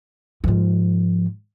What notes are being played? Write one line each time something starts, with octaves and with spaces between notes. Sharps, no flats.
G#2 F3